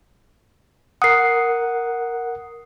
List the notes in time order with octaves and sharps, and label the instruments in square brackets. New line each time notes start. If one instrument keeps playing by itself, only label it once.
[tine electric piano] A#4 F#5 [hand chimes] D#6 C7